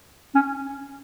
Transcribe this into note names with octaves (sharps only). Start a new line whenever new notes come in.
C#4